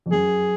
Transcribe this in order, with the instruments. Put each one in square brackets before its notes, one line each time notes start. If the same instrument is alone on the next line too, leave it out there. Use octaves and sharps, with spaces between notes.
[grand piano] F2
[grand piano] F#2 [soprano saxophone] G#4